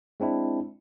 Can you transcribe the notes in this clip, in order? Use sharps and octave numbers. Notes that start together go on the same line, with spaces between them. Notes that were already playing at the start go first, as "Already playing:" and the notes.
G#3 C4 D4 E4